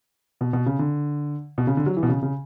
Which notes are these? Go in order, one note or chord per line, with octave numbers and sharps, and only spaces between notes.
B2
B2
C#3
D3
B2
C#3
D3
F#3
E3
B2
C#3
C#3